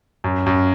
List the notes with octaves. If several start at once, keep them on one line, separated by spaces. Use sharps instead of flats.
F#2
F#2